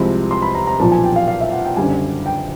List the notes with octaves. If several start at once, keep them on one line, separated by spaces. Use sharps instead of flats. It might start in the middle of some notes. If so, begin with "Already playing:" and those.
Already playing: C2 C3 F3 G#3 B5
C6
B5
A#5
A#5
B1 A#2 F3 A5
G#5
G5
F5
F5
E5
F#5
G5
F#1 F#2 D3 G3 G#5
G5